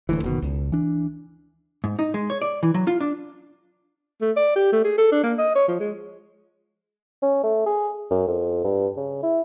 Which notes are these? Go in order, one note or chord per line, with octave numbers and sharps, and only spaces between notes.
D1 D2 E3
F#1 B2 D#3
C#2
E3 D4
G#2
D#4
G#3
C#5
D5
E3
F#3
F4
D4
A3
D5
G4
A3
G#4
A4
D4
A#3
D#5
C#5
F3
G#3
C#4
A3
G#4
F#2
F2
G2
C#3
E4